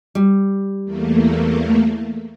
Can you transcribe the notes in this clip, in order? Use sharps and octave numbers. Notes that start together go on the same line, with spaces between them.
G3
E2 A3 A#3